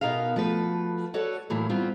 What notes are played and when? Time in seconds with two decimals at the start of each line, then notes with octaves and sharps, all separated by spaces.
0.01 B2 D#4 A#4 B4 F5
0.36 F3 A3 F#4 B4
1.14 F#4 A4 B4 C#5 D5 F#5
1.50 A2 E3 F#3 A#3
1.69 G3 B3 C4 F4